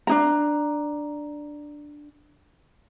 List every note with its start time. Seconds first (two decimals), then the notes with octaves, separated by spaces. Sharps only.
0.07 D4 D#4 A#5